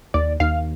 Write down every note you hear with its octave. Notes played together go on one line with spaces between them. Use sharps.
D#2 D5
D#2 F5